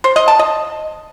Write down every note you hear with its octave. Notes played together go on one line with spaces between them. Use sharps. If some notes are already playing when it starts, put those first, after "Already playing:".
C5
D#5
A5
D#5